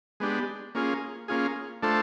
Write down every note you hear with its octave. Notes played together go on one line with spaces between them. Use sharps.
G#3 B3 D4 G4
A#3 C#4 F4 G#4
A#3 C#4 F4 G#4
A3 D4 F4 A4 C5